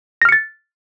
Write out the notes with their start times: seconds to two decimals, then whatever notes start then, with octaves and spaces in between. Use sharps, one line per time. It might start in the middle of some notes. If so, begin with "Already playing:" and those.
0.22 A#6
0.25 F6
0.29 C#7
0.32 A6